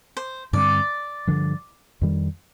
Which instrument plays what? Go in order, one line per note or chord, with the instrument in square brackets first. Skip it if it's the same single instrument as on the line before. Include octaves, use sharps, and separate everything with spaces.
[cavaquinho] C5
[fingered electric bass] G2 D3 G3 C4 [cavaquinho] D5
[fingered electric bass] G2 D3 F3
F2 D#3 G3